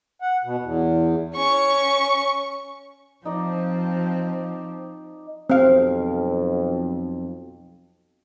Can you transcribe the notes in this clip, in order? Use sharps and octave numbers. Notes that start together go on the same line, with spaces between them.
F#5
B2
E2
C#4 C#6
F3 C4 D#4 D5 D#5
B1 F2 C4 F5